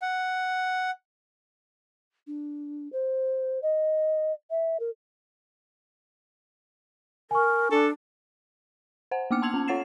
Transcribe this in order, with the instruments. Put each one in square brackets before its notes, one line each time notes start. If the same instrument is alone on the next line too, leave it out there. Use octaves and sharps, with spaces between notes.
[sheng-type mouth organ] F#5
[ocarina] D4
C5
D#5
E5
A#4
[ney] A#4 [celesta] G#5 C#6
[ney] D4 [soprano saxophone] A4
[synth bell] C5 F#5 G#5
A#3 B3 D6 F6 C#7
A5 C6 E6 G#6 F7 F#7
C#4 A5
F4 C#5 F#5 A6 C7 E7